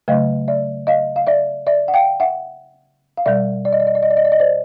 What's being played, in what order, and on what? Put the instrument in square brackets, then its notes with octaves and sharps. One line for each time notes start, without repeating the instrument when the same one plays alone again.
[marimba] C#3 F#3 A3 D#5 F5
D5 E5
D#5 F5
F5
D5 E5
D5 E5
F#5
F5 G5
E5 F#5
F5
B2 G3 D5 E5
D5
D#5
D5
D#5
D5
D#5
D5
D#5
D5
D#5
C5 D5